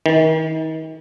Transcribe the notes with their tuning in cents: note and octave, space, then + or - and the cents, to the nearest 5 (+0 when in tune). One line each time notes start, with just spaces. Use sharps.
D#3 +35